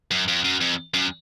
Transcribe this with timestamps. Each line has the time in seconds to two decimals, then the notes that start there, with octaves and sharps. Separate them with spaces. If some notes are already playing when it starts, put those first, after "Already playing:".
0.11 F#2
0.28 F2
0.44 F#2
0.61 F2
0.94 F#2